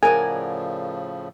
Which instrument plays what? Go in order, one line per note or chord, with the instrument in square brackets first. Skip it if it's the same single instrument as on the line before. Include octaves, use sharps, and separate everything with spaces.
[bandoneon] A2 C#3 F3 [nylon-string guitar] A#4 D5 F#5 [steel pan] G#5